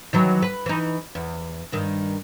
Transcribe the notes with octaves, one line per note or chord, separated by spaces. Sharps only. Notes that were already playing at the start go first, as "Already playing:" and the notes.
D#3 E3 F#3
B4
E3 D#4
E2
G2 D#3